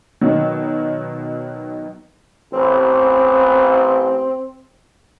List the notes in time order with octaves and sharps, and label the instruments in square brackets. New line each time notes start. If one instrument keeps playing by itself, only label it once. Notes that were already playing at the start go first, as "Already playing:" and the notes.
[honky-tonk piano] B2 D#3 F#3
[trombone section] A1 [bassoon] C4